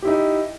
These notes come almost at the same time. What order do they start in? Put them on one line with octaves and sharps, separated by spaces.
G4 E4 D#4